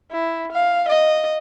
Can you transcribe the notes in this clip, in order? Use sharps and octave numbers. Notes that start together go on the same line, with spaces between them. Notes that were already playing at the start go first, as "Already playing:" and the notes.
E4
F5
D#5